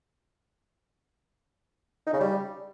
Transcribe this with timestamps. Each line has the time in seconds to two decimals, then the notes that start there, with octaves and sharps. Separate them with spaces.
2.07 D#4
2.13 C#3
2.20 G3